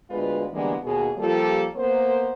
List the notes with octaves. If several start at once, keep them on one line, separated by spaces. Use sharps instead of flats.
D2 G#3 B3 F4 B4
D3 E3 G3 G#3 A#3 B3
D#2 B2 G#4
F3 G3 A#3 F4 G4 A4
A#3 B3 A#4 C5